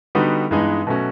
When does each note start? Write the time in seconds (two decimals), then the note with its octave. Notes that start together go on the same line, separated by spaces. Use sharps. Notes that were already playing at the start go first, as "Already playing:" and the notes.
0.15 D3 G3 B3 D#4 F#4
0.51 G2 E3 G#3 B3 D#4
0.87 B2 F#3 A3 C#4 F#4